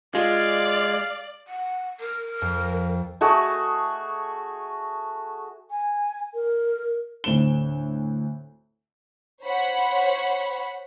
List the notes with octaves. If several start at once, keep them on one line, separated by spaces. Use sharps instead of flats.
G#3 F4 D5 F5
F#5
A#4
F2
A3 F#4 G#4
G#5
A#4
D2 A2 C4 D7 E7 G7
C5 C#5 F#5 B5